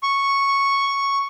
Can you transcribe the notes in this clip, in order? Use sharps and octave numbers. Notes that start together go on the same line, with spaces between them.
C#6